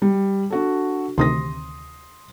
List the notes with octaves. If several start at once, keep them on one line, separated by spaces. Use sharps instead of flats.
G3
D4 F#4 A4
D2 C3 D#3 C6 D#6 A#6